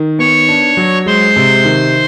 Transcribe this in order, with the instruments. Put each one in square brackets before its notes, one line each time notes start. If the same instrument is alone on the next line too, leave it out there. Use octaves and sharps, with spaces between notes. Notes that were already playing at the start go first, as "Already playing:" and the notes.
Already playing: [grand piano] D#3
[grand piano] B3 [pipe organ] C#5 C#6
[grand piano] D4
F#3
[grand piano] G#3 [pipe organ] C5 C6
[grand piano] C3
D#3